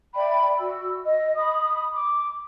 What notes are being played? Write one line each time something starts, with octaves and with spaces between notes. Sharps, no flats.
D5 E5 G5 B5
F#4 E6
D#5
B5 D#6
D6